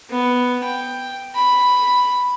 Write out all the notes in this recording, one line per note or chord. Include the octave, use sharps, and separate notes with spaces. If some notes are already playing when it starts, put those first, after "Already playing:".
B3
G5
B5